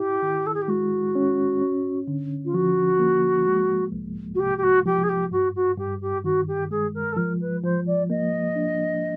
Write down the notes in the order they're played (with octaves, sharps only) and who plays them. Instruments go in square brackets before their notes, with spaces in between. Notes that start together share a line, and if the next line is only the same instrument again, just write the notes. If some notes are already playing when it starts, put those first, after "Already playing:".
Already playing: [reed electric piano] E4 [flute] G4
[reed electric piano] D#3
[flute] A4
G#4
G4
[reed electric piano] G#3 [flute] F#4
[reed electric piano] C#4
C#4
D3
[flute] F4
[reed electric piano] F3 [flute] F#4
[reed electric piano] A#3
G#3
C2
[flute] F#4
[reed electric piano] C3 [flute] G4
[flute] G4
F#4
[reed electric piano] F3 [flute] G4
[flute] G#4
G4
[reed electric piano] G2 [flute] F#4
[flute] F#4
[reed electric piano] G2 [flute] G4
[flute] G4
[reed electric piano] D#3 [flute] F#4
[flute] G4
[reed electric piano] G#3 [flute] G#4
[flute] A#4
A4
[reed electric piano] F3 [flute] A#4
[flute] B4
[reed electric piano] F3 [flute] C5
[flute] D5
[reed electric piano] A#3 [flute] D#5
[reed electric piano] D4